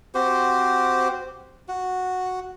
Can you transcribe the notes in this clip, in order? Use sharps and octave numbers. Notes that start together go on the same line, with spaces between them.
C4 F#4 G4 C5
F#4